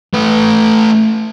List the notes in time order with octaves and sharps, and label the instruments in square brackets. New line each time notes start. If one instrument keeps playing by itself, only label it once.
[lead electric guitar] A3 B4